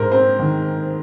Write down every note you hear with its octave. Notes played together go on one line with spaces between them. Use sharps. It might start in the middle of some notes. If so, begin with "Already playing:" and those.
Already playing: G#2 G#3 A#4 C5
C4 C5
D#3